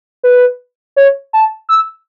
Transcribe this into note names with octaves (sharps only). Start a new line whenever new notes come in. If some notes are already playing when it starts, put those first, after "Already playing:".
B4
C#5
A5
E6